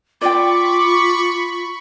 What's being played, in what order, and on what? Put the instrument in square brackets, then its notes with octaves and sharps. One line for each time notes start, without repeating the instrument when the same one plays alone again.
[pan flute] F4 [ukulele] D5 G5 [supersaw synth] B5 C#6 [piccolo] D6